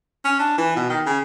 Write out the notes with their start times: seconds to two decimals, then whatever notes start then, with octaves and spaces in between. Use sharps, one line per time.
0.25 C#4
0.39 D4
0.58 E3
0.76 B2
0.90 D#3
1.06 C#3